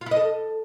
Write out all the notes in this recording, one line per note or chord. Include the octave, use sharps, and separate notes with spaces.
F4
E4
D#5
A4